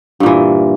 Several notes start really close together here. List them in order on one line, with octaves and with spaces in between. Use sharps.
G2 A#2 E3